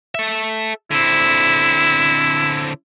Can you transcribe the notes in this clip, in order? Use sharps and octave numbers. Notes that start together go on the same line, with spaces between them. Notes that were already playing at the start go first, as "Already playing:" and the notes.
A4 E5
D3 C4 E4